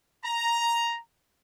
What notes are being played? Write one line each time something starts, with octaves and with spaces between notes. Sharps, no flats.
A#5